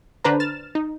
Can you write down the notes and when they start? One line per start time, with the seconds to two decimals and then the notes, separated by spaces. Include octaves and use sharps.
0.24 D3 D4 B4 C5 A#5
0.40 F6 A6 E7
0.75 D#4